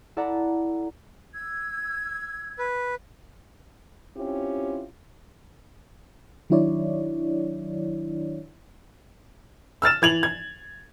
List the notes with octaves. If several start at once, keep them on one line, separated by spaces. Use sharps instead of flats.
E4 A4 D5 F#5 A#5
E6 G#6
B4
C4 C#4 E4 F4 G4
D#3 F#3 D4 E4 C#5 D5
E6 F6 A6 E7
E3 G#6 F7 F#7
G#6